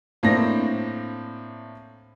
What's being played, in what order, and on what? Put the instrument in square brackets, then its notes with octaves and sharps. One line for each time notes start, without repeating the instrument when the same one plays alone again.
[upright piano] A2 A#3 C4 D4 A#6